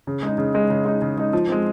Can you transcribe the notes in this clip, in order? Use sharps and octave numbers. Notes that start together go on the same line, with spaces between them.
C#3
G#3 D#4
C#3
G#3 D#4
C#3
G#3 D#4
C#3
G#3 D#4
F3
G#3 C4